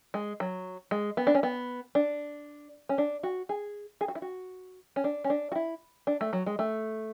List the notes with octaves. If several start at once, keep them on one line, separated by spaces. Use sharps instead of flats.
G#3
F#3
G#3
B3
D4
C#4
B3
D4
C#4
D4
F#4
G#4
G#4
F#4
E4
F#4
C#4
D4
C#4
D4
F#4
E4
D4
A3
F#3
G#3
A3